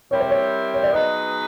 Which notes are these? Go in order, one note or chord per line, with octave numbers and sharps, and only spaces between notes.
G3 C4 E4 G4 A#4 C#5
C5
C#5
C#5
D5
F#3 B3 D#4 G#4 B4 D#5